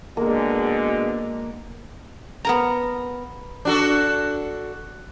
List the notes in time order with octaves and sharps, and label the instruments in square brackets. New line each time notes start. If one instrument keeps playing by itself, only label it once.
[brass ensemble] B2 D3 G#3 [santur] A#3
[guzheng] B3 A#4 A#5
[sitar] D4 F#4 A4